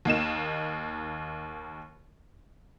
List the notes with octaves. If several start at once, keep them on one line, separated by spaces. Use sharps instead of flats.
D#2 A#3 D#4 E7